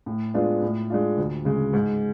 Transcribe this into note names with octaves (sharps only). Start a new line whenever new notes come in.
A2
G#3 B3 D4 F4
A2
G#3 D4 F4
D2
C#3 G#3
G#2